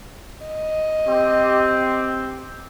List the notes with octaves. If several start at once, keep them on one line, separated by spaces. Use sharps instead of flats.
D#5
C4 G4